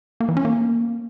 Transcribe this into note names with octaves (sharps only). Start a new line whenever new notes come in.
A#3
E3
C#4
A#3